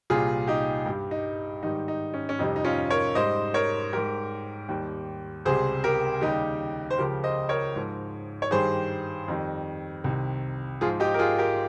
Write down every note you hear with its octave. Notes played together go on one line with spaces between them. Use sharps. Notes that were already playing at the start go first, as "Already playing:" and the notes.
C2 A#2 G3 F4 G#4
D#4 G4
G2 G3
D#4
G#2 D#3 G3 D#4
D#4
C#4
C#4
F2 C3 G3 D#4
D#4
C#4 F4
A#4 C#5
G#2 G3 C5 D#5
A#4 C#5
G#2 G3 G4 A#4
D#2 D#3 G3
C#2 C3 G3 G#4 C5
G4 A#4
D#2 C#3 G3 D#4 G4
C5
C#2 C#3 F3 G4 A#4
C5 D#5
A#4 C#5
G#2 F3
C#5
G2 D#3 G3 G#4 C5
F2 D#3 G3
C2 C3 D#3
G#2 F3 F4 G#4
D#4 G4
A#4
F4 G#4
G4 A#4